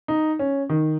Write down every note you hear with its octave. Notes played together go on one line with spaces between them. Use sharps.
D#4
C#4
D#3